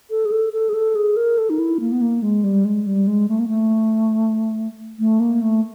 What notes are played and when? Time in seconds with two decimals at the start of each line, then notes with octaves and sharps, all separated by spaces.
0.10 A4
0.25 G#4
0.32 A4
0.53 A4
0.69 G#4
0.74 A4
0.95 G#4
1.16 A#4
1.38 A4
1.50 D#4
1.59 E4
1.80 A#3
1.92 B3
2.02 A#3
2.22 G#3
2.44 G3
2.65 G#3
2.86 G3
3.07 G#3
3.29 A3
3.39 A#3
3.48 A3
4.99 A3
5.20 A#3
5.42 A3